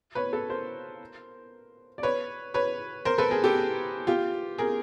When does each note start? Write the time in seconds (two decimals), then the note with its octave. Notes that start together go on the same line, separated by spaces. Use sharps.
0.15 B4 C#5
0.33 A4 B4
0.50 A#4 C5
1.98 D5
2.03 B4 C#5
2.54 B4 C#5
3.05 A#4 C5
3.18 A4 B4
3.31 G#4 A#4
3.44 G4 A4
4.07 F4 G4
4.58 G#4 A#4